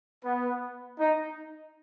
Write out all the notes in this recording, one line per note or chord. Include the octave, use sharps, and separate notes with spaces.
B3
D#4